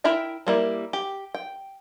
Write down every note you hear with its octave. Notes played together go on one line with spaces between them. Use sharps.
E4 A#4 E5 G5
G3 A#3 E4
G4
G5